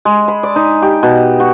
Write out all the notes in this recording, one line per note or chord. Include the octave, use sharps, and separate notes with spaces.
G#3
B5
D5
D#4
G4
B2
F#4